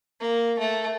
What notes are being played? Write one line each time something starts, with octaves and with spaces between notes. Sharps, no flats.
A#3
A3